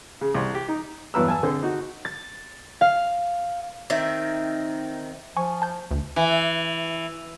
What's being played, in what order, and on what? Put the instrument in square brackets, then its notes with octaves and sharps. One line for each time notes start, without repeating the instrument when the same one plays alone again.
[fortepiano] C#3
C2
G4
D#4
E2 G2 F#3 B4 A#5 E6
G#5 A5 E6
D3 C4 G#4 A4 C5
D#4 F#4
[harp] A6
F5
[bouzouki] D#3 C4 E5
[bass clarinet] F3 [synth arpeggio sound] G#5 C#6
[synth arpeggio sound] A5 G6
[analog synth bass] D2
[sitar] E3